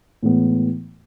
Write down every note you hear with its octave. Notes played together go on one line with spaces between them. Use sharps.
A2 E3 G#3 B3